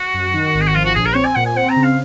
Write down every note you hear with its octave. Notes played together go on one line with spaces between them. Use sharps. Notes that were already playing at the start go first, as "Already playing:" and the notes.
Already playing: F#4
F#2
D#3
G#1
G#4
F#4
F3 F4
F#4
A#1 G#4
A#4
C4 C#5
G#5
A#2 F#5
G#5
C4 F#5
A#5
C#3
F5